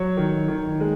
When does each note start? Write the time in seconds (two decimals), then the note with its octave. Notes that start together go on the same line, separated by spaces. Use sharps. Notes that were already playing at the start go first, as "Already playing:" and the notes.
Already playing: F#3 C#5
0.17 D#3
0.48 D#3
0.80 G#3